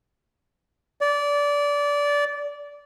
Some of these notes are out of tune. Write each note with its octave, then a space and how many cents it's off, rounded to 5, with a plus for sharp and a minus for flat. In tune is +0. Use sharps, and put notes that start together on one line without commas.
D5 -20